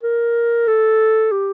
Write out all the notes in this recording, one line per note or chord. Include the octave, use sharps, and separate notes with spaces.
A#4
A4
G4